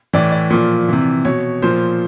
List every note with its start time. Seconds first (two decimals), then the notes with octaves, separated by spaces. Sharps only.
0.13 A2 E3 D5
0.32 D5
0.50 A#2 F3
0.89 C3 E3
1.25 B2 C#5
1.62 A#2 F3 C5